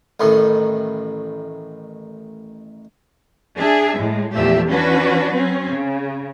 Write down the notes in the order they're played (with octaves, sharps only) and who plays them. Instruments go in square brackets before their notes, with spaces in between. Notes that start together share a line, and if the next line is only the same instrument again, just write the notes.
[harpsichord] A1 A2 D#3
[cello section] D4 G#4 E5
A2 G#3
E2 A#2 F3 A3 G4 E5
E3 C#4 D4 F#4 B4
F#3 C4 C#4
C#3